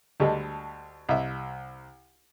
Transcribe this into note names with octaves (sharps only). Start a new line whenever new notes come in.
D2 G3 G#3 A4
C2 E5